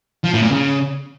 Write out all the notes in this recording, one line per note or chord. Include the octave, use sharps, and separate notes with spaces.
F3
A2
A#2
C#3